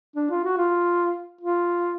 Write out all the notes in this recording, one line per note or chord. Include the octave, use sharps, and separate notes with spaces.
D4
F4
F#4
F4
F4